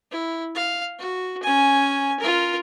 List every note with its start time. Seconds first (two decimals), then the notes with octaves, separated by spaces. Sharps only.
0.11 E4
0.55 F5
0.99 F#4
1.43 C#4 G#5
2.20 F4 A#4